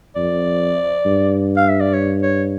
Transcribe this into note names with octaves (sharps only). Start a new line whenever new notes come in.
F2 D5
G2
F5
E5
D5
C#5
C#5